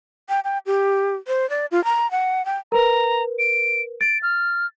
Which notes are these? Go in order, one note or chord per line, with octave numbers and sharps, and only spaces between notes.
G5
G5
G4
C5
D5
F4
A#5
F#5
G5
A#4 B4 A#5
D7
A6 D7
F6